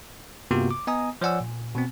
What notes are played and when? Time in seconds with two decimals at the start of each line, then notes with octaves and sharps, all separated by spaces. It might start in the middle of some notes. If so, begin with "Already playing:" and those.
0.51 G2 C3 A#3 B3 F4 F#4
0.71 D6
0.87 B3 D#5 G#5 A#5 D#6
1.21 F3 C#5 D5 F#5 G#5 E6
1.40 A#2
1.75 B2 B3 C4